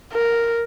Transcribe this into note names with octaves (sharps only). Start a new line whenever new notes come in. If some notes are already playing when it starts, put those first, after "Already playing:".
A#4